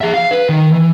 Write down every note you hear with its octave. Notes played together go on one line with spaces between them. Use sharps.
G#4 E5
F5
B4
D#3
E3